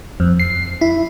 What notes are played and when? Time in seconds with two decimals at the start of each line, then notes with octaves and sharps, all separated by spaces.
0.20 F2
0.40 C7
0.81 E4